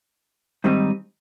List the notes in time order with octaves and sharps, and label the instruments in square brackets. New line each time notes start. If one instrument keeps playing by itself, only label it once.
[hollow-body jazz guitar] G#2 D#3 G3 C4 D#4